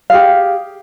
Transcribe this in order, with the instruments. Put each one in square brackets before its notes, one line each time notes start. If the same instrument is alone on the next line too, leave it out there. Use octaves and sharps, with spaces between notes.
[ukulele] G4 G#4 F5